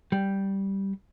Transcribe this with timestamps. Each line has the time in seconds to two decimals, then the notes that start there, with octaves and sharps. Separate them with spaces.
0.12 G3